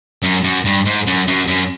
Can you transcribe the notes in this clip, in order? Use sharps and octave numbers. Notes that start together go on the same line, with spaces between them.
F#2
F#2
G2
G#2
F#2
F#2
F#2